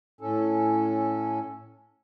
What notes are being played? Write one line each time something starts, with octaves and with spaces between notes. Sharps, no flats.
A2 C#4 A4